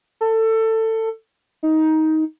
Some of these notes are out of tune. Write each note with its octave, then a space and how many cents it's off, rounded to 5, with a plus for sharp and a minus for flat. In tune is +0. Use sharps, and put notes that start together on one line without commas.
A4 +20
D#4 +15